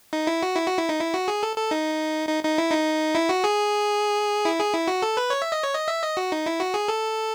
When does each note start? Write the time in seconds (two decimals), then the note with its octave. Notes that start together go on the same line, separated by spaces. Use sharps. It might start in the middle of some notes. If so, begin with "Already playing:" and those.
0.13 D#4
0.27 E4
0.43 F#4
0.56 E4
0.67 F#4
0.78 E4
0.89 D#4
1.00 E4
1.14 F#4
1.28 G#4
1.43 A4
1.57 A4
1.71 D#4
2.29 D#4
2.43 D#4
2.58 E4
2.72 D#4
3.15 E4
3.29 F#4
3.44 G#4
4.45 E4
4.59 G#4
4.73 E4
4.88 F#4
5.02 A4
5.17 B4
5.30 C#5
5.42 E5
5.52 D#5
5.63 C#5
5.74 D#5
5.88 E5
6.02 D#5
6.17 F#4
6.32 D#4
6.46 E4
6.60 F#4
6.74 G#4
6.88 A4